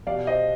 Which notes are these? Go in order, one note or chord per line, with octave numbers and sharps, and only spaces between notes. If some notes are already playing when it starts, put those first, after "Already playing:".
B2 G3 D5 F5
C5 D#5